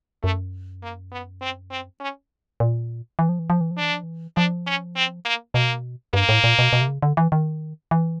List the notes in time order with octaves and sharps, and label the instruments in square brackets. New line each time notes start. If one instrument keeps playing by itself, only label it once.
[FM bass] F#2 [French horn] A3
[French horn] A#3
B3
C4
C4
C#4
[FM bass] A#2
E3
F3
E3
F3
E3
F3
[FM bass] E3 [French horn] D4
[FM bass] F3
E3
[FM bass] F3 [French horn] D4
[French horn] C#4
C4
A#3
[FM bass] B2 [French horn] A#3
[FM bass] G2 [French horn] A#3
[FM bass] A2
A#2
B2
B2
C3
C#3
D3
E3
D#3
E3